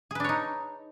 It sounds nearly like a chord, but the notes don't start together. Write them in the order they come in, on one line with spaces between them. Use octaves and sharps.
G#4 B4 D4 C#5 D#4